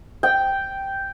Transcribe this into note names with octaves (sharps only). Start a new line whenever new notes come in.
G5